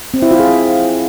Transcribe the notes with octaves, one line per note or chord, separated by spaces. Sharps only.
C4
E4
F4
G#4